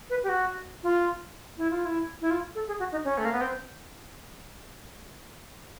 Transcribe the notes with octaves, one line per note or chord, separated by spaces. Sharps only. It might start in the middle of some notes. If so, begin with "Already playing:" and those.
B4
G4
F#4
F4
E4
F4
E4
E4
F4
A4
G#4
F#4
D#4
C#4
A3
A#3
B3
C4